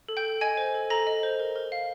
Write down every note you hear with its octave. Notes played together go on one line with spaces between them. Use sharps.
A4
G5 G6
A4
D#5 G#5 G#6
C5
A4
A4 A#5 A#6
D#5
C5
A#4
A#4
F5